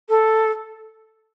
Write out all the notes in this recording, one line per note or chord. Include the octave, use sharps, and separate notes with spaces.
A4